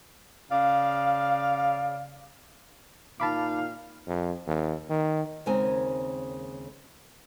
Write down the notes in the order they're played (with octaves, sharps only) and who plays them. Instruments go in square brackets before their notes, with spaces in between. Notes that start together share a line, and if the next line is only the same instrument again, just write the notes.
[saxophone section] C#3 D5 F5
[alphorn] A#2 [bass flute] D#4 [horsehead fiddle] F5 [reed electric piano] A5 B5 D6
[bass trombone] F2
D#2
D#3
[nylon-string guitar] D#2 C#3 G#3 C4 A#4 G#5